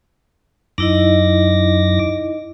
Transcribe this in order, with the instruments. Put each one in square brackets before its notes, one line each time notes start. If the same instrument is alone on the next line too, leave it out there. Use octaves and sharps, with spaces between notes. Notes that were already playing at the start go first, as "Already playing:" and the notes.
[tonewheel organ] F#2 D6 A#6 [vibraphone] D#4 E4 D#5